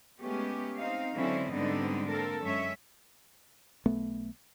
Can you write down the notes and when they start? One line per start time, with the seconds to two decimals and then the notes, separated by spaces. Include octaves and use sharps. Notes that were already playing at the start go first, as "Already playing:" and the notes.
0.22 G#3 A3 B3 C#4 G4
0.77 C4 D#4 F5
1.15 D3 F#3 G#3 C4 C#4 E4
1.52 G#2 D3 G3 B3 C4 D#4
2.11 A#3 C4 A4 A#4
2.42 F#2 G#3 C#4 C#5 E5
3.86 B1 A3 B3